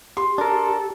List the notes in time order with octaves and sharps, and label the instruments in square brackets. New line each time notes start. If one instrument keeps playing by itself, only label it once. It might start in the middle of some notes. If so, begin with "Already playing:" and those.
[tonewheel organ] G4 [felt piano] C6
[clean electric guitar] D4 A#4 [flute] A4